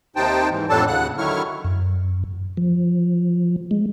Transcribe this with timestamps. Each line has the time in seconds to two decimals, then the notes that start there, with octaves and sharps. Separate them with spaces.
0.16 D#2 C3 D#4 C5 G5 A5
0.51 G#2 E3
0.69 F2 A2 F#3 D4 A4 A5
0.87 D#2 C#3 F#5 F#6
1.18 D3 D#3 F#3 E4 C#6 F6
1.65 F#2
2.57 F3
3.71 G#3